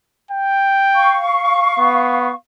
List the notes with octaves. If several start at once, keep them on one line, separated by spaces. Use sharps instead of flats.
G5
F5 C#6
B3